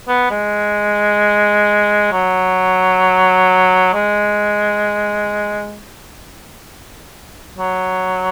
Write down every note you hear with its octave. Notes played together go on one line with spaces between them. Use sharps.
B3
G#3
F#3
G#3
F#3